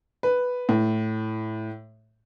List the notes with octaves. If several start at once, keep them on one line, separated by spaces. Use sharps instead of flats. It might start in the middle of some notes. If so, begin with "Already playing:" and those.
B4
A2